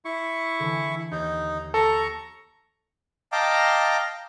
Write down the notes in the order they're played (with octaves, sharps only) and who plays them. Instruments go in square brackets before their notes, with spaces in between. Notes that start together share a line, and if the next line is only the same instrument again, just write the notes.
[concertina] E4 C#6
[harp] D3 E3
[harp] D#2 G6 [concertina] D#4
[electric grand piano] A4 [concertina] A#5 C#6
[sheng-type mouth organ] D#5 F5 G5 A5 A#5 D6